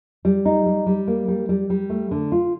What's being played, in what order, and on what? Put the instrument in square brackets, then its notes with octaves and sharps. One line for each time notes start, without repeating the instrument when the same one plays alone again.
[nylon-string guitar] G3
D#4
G3
G3
A#3
G3
G3
G3
A3
D3
F4